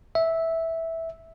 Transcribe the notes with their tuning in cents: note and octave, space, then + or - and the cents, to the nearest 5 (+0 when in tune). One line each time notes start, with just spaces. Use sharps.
E5 -10